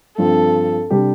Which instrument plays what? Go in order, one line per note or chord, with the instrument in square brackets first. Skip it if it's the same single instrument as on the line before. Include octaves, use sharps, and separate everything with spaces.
[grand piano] G2 F3 C4 [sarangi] A4
[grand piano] C3 G3 D4 G4